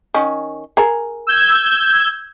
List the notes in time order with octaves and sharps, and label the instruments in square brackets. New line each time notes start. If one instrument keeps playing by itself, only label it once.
[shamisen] D#3 C#4
G#4 A#4
[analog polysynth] E6 G6 G#6